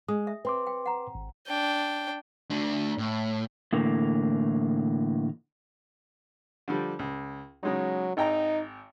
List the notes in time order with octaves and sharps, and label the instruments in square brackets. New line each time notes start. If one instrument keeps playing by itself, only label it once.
[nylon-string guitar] G#3 [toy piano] D#6
[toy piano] E5
[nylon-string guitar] C4 [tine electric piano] B4 C6 D6
[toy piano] G5
F#5 A#5
[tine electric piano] G#1
[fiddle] D4 G5
[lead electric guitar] A3 D4
A2
[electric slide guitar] A2 D3 E3 A#3
[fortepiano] D3 F3 G3
C#2
[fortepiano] C#3 G#3 D#4 [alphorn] F#3
[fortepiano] G#1 G5 A#5 [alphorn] D#4